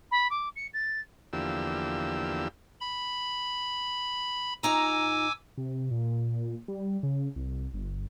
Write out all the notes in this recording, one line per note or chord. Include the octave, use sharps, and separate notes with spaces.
B5
D6
C#7
A6
E2 D3 F3 A#3 G4 E6
B5
A#2 D#4 G#5 A#5 D6 E6
C3
A#2
G3
C#3
C2
G1